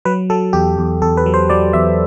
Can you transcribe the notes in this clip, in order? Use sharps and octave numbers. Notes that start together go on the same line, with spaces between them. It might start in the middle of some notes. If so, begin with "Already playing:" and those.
F#3 B4
F#3 A4
E2 G4
E2
E2 A4
B4
F#3
C5
F#3 D5
E2 E5